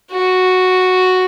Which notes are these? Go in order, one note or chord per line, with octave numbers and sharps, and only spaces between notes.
F#4